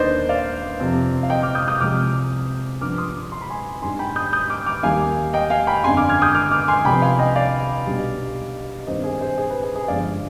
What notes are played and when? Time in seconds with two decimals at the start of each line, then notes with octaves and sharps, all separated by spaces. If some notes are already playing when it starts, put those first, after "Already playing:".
Already playing: D#2 D#3 B3 D4 C5 D5 D#5
0.29 D5 F5
0.79 F2 C3 F3 C4
1.23 F5
1.30 D#5 G5
1.43 D6 F6
1.55 D#6 G6
1.68 D#6 G6
1.80 C2 C3 F3 G#3 C4 D6 F6
2.81 G2 F3 B3 D4 D6 F6
2.98 C6 D#6
3.32 C6
3.41 B5
3.50 G#5 C6
3.82 G#2 G3 D4 G#5 C6
3.99 G5 B5
4.16 D#6 G6
4.33 D#6 G6
4.49 D6 F6
4.66 D6 F6
4.83 D#2 D#3 G3 F5 G#5
5.33 D#5 G5
5.50 F5 G#5
5.67 G5 B5
5.84 G1 F2 D3 G#5 C6
5.97 D6 F6
6.09 F6 G#6
6.22 D#6 G6
6.35 D6 F6
6.51 D6 F6
6.68 G#5 C6
6.85 C2 C3 F3 B3 G5 B5
7.02 F5 G#5
7.19 D#5 G5
7.35 D5 F5
7.86 B1 B2 G3 D4
8.87 G2 D#3 G3 C4 C5 D#5
9.04 G#4 C5
9.21 G#4 C5
9.37 G#4 C5
9.50 B4
9.63 G#4
9.75 G#4
9.88 G1 G2 F3 G#3 D5 F5